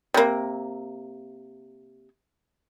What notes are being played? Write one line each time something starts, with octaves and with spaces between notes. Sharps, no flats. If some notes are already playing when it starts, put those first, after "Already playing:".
C3 A#3